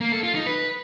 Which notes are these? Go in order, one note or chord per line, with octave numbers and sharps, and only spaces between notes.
A#3
A4
F4
D#4
B4